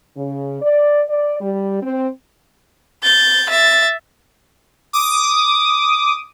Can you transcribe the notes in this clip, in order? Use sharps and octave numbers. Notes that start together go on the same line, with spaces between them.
C#3
D5
D5
G3
C4
G6 A6
E5 A6
D6 D#6